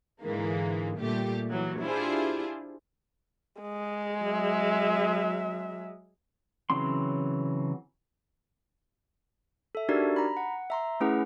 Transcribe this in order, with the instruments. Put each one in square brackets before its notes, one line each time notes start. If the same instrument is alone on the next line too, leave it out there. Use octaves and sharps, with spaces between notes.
[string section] G#2 D3 E3 G#3 A#3
A#2 G3 A3 G4
E3 F#3
D4 E4 F4 G4 G#4 C5
[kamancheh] G#3
[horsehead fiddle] F#3 E5
[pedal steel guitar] C#3 E3 F#3 C4 C6
[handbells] A4 E5
D4 D#4 F#4 G4 A#4 D5
A#5 B5
F#5
E5 A#5 C6
A3 C#4 E4 G#4 B4 F#5